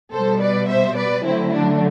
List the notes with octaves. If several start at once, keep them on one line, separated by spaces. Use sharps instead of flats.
B2 G3 A4 C5
B4 D5
C5 E5
B4 D5
D3 F#3 A3 C4 E4
D4